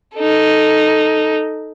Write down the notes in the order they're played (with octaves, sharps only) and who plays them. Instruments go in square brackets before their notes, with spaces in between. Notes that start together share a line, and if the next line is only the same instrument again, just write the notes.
[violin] D#4 A4